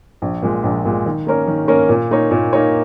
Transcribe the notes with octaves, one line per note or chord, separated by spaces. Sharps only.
A#1
A#2 G#3
A#1
A#2 G#3
D#3
A#3 C#4 A#4 C#5
D#3
A#3 C#4 A#4 C#5
A#2
A#3 D#4 C#5
A#2
A#3 D#4 C#5